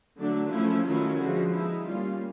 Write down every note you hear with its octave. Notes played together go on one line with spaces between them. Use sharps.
D3 F#3 A3 D4
F3 A3 C#4 E4
D#3 F#3 A3 C#4 E4 F4
D3 F3 G#3 F#4
G#3 B3 D#4 E4
G3 A#3 C#4 F4